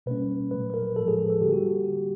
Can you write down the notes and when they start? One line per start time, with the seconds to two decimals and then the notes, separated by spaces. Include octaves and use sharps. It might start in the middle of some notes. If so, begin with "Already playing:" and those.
0.06 B2 G3 A#3 C#4 B4
0.51 A#2 F#3 A3 B4
0.70 B4
0.74 A#4
0.96 A2 F3 G#3 A4
1.08 G#4
1.19 A4
1.30 A4
1.41 D3 G3 A#3 G4
1.53 F#4